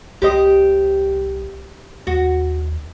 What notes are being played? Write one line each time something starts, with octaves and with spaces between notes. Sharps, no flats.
C2 G4 C5 D#5
D#2 F#4